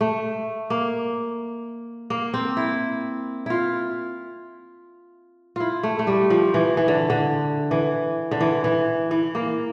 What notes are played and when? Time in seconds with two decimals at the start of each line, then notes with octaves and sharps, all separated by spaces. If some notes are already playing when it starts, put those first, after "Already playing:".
0.01 A3
0.70 A#3
2.10 A#3
2.34 C4
2.57 E4
3.46 E4 F4
5.56 E4 F4
5.83 A3
5.99 A3
6.07 G3
6.30 F3
6.54 E3
6.77 E3
6.88 D3
7.10 D3
7.71 E3
8.31 D3
8.41 E3
8.64 E3
9.11 E3
9.35 A#3